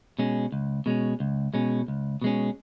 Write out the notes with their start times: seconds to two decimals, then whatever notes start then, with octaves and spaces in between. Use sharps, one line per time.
0.19 B2 G#3 C#4
0.52 C#2
0.86 B2 G#3 C#4
1.20 C#2
1.54 B2 G#3 C#4
1.88 C#2
2.22 B2 G#3 C#4